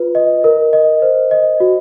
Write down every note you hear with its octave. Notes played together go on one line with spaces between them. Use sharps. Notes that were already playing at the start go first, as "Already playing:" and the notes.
Already playing: F4 B4
D#5
A#4
D#5
C5
D#5
F#4